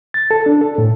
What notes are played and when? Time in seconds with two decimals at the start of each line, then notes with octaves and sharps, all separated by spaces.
0.14 A6
0.31 A4
0.46 D4
0.61 A4
0.78 A2